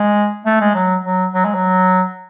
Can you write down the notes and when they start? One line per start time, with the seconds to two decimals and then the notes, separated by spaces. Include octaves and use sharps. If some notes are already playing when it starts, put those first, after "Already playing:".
Already playing: G#3
0.46 A3
0.60 G#3
0.75 F#3
1.05 F#3
1.34 F#3
1.45 G#3
1.54 F#3